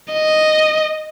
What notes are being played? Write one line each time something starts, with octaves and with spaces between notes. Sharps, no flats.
D#5